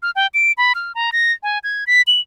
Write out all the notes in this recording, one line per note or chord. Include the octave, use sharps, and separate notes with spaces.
F6
G5
D7
B5
F6
A#5
A#6
G#5
G#6
B6
F#7